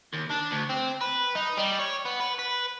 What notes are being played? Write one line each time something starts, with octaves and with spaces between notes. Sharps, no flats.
D#2
D4
D2
C4
B4
D#4
G3
C#5
B3
B4
B4